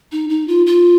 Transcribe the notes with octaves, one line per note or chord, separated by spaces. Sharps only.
D#4
D#4
F4
F4